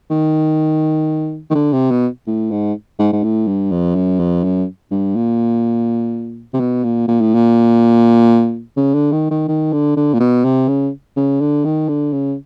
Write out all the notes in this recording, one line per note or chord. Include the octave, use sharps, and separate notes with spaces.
D#3
D#3
D3
C3
B2
A2
G#2
G#2
G#2
A2
G2
F2
F#2
F2
F#2
G2
A#2
C3
B2
A#2
A#2
A2
A#2
C#3
D3
D#3
D#3
D#3
D3
D3
A#2
B2
C3
C#3
C#3
D3
D#3
D3
C#3